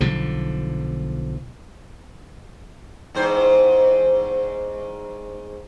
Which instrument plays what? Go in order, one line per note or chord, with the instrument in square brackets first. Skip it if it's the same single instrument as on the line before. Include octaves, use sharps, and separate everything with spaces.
[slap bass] B1 D3 F3
[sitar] E2 G#2 C5